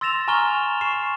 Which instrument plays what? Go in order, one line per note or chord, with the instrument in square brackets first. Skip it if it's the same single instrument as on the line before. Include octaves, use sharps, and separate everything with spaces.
[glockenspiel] C6 E6 A6 A#6 E7 F7
G#5 A#5 C#6 F6 F7 G7
C#6 C7 E7